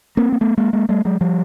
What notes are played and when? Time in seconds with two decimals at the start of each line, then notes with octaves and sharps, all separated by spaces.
0.17 A#3 C4
0.32 A#3
0.41 A3 B3
0.58 G#3 A#3
0.73 G#3 A#3
0.89 G3 A3
1.05 F#3 G#3
1.21 F3 G3